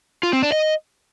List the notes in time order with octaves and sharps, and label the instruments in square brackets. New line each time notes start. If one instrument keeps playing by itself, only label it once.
[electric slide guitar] F4
C4
D4
D#5